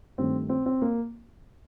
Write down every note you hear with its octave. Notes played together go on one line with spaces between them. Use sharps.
G2 D#3 A3 C4
C4
C4
A#3